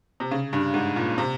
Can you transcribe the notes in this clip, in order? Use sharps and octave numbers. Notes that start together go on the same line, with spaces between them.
C3
C#3
G2
G#2
A#2
C3